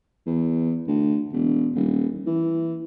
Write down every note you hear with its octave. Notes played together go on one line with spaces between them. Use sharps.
E2
D2
E1
D#1
E3